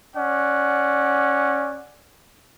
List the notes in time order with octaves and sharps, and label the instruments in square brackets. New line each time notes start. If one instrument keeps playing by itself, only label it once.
[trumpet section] C#4 D5 F#5